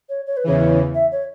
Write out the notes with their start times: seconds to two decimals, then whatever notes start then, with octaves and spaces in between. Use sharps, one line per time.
0.09 C#5
0.27 C#5
0.37 B4
0.44 E2 C#3 E3 C#5
0.94 E5
1.12 C#5